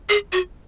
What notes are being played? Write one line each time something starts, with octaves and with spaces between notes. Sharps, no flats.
G#4
F#4